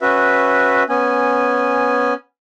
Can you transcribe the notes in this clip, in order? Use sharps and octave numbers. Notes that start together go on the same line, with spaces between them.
C#4 F#4 B4 E5
B3 C#4 G#5